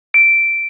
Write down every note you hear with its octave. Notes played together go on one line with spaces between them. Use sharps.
D7